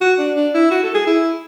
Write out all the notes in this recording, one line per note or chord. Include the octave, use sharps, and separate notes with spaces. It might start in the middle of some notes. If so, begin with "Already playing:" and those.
F#4
D4
D4
E4
F#4
A4
G#4
E4